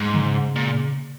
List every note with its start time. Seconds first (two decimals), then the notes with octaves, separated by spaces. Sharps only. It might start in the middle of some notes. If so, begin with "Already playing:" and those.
Already playing: G#2
0.14 C#3
0.56 A#2